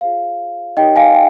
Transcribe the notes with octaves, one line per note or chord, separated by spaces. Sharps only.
F4 G#4 C5 F5
D#4 G4 A#4 C#5 D#5 G5
F5 G#5
G5